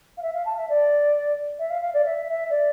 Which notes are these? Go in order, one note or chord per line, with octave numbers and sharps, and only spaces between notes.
F5
E5
F5
A5
E5
D5
E5
F5
F5
D5
E5
E5
D5